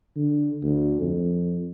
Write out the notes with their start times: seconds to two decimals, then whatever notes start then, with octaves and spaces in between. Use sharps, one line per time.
0.16 D3
0.63 D2
1.01 F2